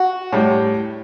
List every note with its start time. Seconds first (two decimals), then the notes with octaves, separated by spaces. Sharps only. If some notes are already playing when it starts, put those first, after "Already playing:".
Already playing: F#4
0.33 A2 G3